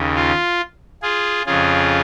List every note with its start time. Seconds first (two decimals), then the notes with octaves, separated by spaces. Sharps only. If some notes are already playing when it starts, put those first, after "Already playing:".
Already playing: D#2 C#3
0.15 F4
1.02 F4 G#4
1.46 F2 C#3 F4 G#4